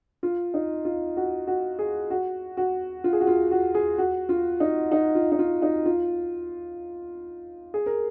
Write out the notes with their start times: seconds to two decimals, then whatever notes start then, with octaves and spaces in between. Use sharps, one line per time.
0.23 F4
0.54 D#4
0.85 F4
1.17 F#4
1.47 F#4
1.79 G#4
2.10 F#4
2.57 F#4
3.04 F4
3.13 G#4
3.20 F#4
3.27 F4
3.51 F#4
3.75 G#4
3.98 F#4
4.29 F4
4.60 D#4
4.92 D#4
5.15 F4
5.32 D#4
5.39 F4
5.62 D#4
5.86 F4
7.74 G#4
7.86 A#4